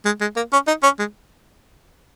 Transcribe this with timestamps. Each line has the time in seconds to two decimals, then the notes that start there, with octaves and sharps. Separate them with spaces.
0.05 G#3
0.21 G#3
0.36 A#3
0.53 C#4
0.67 D#4
0.83 C#4
0.99 G#3